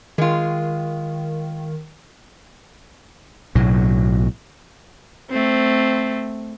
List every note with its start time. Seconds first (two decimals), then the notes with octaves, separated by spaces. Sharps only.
0.18 D#3 G#3 F4
3.55 B1 A2 F#3
5.30 A3 C4